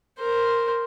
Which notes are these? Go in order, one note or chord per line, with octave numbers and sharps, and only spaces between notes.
A#4 C5